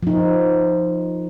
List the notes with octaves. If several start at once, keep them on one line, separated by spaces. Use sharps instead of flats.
F3 D#4